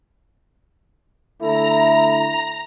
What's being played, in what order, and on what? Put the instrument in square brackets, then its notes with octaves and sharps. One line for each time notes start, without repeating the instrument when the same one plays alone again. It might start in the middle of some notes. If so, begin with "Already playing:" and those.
[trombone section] D3 A3 E4 [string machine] A#5